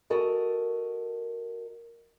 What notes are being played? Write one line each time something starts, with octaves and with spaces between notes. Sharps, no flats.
F#4 A4 A#4 D#5